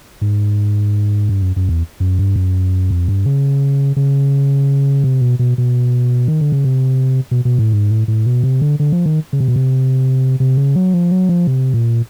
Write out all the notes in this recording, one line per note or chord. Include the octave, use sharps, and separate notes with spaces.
G#2
G2
F#2
F#2
E2
F#2
G2
F#2
F2
G2
C#3
C#3
C3
B2
B2
B2
D#3
D3
C#3
C3
B2
B2
A2
G#2
A2
A2
B2
C3
D3
D3
F3
D#3
C#3
C3
B2
C3
C3
C#3
F#3
F3
F#3
F3
C3
A#2